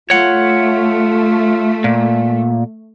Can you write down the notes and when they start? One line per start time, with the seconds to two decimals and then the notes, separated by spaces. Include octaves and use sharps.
0.10 A3 F4 C#5 F#5
1.84 A#2